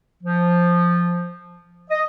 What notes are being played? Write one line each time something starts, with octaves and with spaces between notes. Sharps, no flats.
F3
D#5